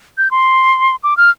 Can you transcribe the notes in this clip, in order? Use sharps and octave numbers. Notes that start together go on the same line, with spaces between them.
G6
C6
D6
F6